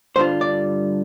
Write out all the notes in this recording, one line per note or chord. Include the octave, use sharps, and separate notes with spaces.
G2 D3 G3 D4 F4 C5
D5